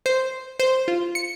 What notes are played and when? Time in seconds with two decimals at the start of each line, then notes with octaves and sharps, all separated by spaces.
0.06 C5
0.60 C5
0.88 F4
1.15 C#7